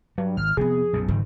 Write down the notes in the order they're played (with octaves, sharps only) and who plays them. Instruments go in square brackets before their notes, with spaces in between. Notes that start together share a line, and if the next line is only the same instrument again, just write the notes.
[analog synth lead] G2 [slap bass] F#3
[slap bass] G#1 [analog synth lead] F6
[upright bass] F2 F3 [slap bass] C3 A3 B3 [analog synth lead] G#4
[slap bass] B1 F#2 A#2
[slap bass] F#1 D#3 [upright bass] G#2